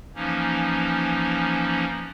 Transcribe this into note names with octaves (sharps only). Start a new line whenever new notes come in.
E3 F3 A#3 C#4 D#4